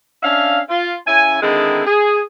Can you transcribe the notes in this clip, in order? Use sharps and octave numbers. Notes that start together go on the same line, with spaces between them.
C#4 D4 E5 F5
F4
C#3 C#4 E4 G#5
D3 D#3 G#3 C4 D#4 E4
G#4